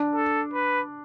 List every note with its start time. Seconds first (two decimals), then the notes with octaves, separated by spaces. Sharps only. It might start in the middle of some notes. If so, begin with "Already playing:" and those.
Already playing: D4
0.15 A4
0.53 B4